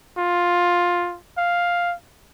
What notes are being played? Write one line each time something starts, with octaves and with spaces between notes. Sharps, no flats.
F4
F5